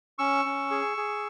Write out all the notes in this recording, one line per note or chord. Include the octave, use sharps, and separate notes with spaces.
C#4 C#6 E6
C#4
G#4
G#4